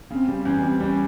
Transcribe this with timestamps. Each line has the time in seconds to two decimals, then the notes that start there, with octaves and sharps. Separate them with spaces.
0.11 C#3 C4
0.28 G3
0.45 E2 C#4
0.63 G3 C4
0.80 G3 C#4